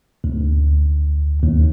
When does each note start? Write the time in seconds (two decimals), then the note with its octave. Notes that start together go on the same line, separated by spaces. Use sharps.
0.24 D2
1.43 D#2